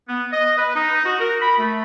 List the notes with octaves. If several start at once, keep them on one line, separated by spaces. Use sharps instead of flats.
B3
D#5
B4
D#4
F#4
A#4
B5
A3